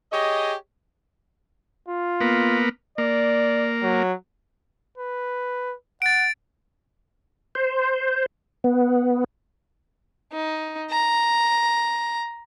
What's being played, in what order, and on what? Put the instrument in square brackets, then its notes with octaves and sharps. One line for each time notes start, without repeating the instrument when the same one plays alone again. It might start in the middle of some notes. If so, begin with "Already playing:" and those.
[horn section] G4 G#4 C#5 D#5
[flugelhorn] F4
[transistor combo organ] A#3 B3
[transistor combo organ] A#3 [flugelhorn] D5
[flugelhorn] F#3
[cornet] B4
[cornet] F#5 [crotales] A6 D7
[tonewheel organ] C5
B3
[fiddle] D#4
A#5